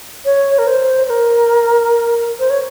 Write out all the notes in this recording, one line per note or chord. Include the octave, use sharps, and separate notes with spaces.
C#5
A#4
C5
C5
A#4
C5
C#5